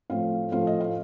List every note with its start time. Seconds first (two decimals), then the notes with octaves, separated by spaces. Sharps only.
0.10 A2 F3 A3 C4 F5
0.52 A2 F3 A3 C4 F5
0.67 D#5
0.81 F5